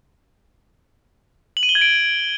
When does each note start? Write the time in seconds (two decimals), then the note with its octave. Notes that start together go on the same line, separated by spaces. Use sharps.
1.57 F#7
1.63 D#7
1.69 G7
1.75 G#6
1.81 D7